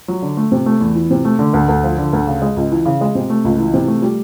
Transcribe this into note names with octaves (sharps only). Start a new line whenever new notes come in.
F#3
D3
A3
C3
A3
E2
E3
C3
A3
D3
D2
D2
F3
D3
D2
C#3
G#3
C#2
E3
C#3
G#3
C3
A3
C#2
E3
C3
A3
G3